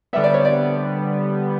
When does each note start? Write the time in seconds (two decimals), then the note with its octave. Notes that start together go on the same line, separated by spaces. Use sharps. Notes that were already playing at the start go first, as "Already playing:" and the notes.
0.13 D3 G3 B3 E5
0.24 D5
0.34 C#5
0.45 D5